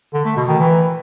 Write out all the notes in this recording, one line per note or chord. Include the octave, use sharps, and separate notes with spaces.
D3
A3
B2
D#3
E3